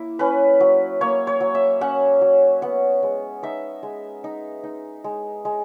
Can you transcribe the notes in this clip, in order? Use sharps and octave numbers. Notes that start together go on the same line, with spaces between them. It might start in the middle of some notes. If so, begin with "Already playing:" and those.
Already playing: A#3 E4
C#4 B4
F#3
A#3 C#5
C#5
F#3
E5
C#4 F#5
F#3
B3 F#5
G#3
D#4 E5
G#3
D#4
D#4
G#3
G#3